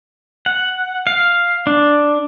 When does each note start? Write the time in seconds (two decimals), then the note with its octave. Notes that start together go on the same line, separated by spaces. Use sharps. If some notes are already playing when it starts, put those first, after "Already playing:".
0.46 F#5
1.07 F5
1.67 D4